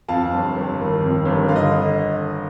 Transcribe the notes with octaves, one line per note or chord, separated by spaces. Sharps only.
F2 F5 A5
G1
G1
D#3
F2
G1
D3 F5
D#5